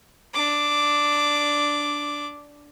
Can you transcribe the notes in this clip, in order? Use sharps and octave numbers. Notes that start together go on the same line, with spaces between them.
D4 D6